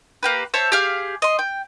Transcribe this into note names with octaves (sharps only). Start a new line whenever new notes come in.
A#3 G4 B4
C5 C#5 E5 A5
G4 G#4 F5
D#5 C6
G5